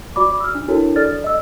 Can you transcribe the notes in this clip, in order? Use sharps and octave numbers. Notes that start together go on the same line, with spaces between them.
F#4 D5 B5 D6
E6 F6
D4
D4 E4 F#4 A4 A#4 C#5
A4 D5 F6 A6
D#5 E6